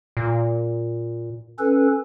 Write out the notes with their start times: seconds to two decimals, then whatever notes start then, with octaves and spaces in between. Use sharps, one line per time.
0.17 A#2
1.59 C#4 A4 B4